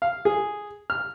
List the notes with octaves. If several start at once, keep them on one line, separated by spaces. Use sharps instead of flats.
F5
G#4
F6